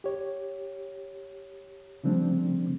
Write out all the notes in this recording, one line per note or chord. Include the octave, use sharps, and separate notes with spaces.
G4 C#5
C#3 F3 G3 A3 C4 D4